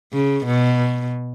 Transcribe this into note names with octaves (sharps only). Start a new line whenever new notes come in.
C#3
B2